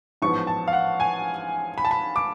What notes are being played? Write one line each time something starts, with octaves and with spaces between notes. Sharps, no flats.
A1 G#2 F3 B3 C#6
A5
F5
F#5
G#5
B5
A5
B5
D6